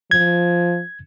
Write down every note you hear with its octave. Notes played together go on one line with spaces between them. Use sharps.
F3 G#6